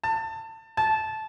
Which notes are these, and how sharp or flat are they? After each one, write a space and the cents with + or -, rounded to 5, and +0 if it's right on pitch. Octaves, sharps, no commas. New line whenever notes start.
A5 +25
A5 -15